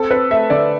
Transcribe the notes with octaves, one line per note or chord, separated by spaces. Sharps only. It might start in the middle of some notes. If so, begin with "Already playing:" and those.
Already playing: C4 A4
C4 B4
A3 E5
D3 D5